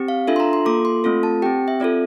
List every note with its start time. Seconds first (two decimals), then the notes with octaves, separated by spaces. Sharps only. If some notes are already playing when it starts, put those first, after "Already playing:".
Already playing: C4 G4
0.08 F5
0.27 D4 F4 A4 E5
0.36 C6
0.40 A#5
0.53 C6
0.66 A#3 F4 A4 D6
0.85 C6
1.04 A3 C4 F4 A4
1.23 A5
1.42 C4 G4 G5
1.68 E5
1.80 C4 F4 A4 D5